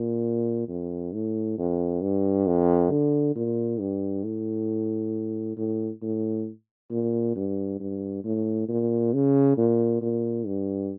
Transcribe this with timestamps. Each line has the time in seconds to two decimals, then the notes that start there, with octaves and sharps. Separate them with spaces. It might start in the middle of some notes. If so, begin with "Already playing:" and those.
Already playing: A#2
0.68 F2
1.14 A2
1.58 F2
2.02 G2
2.47 F2
2.91 D3
3.36 A#2
3.80 G2
4.24 A2
5.57 A2
6.02 A2
6.91 A#2
7.36 G2
7.80 G2
8.25 A2
8.69 A#2
9.14 C#3
9.58 A#2
10.02 A#2
10.46 G2